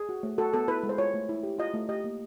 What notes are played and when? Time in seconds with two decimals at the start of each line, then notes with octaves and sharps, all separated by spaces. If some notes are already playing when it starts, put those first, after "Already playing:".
Already playing: G#4
0.09 F#4
0.23 A3
0.38 F#4 A4
0.53 B3 A4
0.68 E4 B4
0.83 G#3
0.89 C5
0.98 F4 C#5
1.14 A3
1.29 E4
1.43 G4
1.58 F4 D#5
1.74 A3
1.89 G4 D#5
2.04 A#3